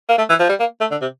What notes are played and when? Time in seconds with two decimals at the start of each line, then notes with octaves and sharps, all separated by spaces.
0.09 A#3
0.18 A3
0.29 E3
0.39 F3
0.49 G3
0.60 A#3
0.81 A3
0.91 D3
1.01 C3